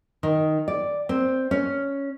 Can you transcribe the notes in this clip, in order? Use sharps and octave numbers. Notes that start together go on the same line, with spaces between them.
D#3
D5
C4
C#4